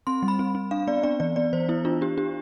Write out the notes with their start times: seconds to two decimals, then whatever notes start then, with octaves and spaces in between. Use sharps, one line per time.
0.07 C4 C6
0.22 G3
0.28 B5
0.39 C4
0.55 C4
0.71 D4 F5
0.87 B3 D5
1.03 D4 D5
1.20 E3 D5
1.36 B3 D5
1.53 E3 C5
1.69 B3 E4
1.85 D4 F4
2.01 D4 G4
2.17 D4 G4